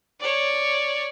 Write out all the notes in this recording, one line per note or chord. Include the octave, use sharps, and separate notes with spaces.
C#5 D5